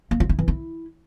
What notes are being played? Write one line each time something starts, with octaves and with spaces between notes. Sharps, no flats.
A#3
F4
E4
E3
E4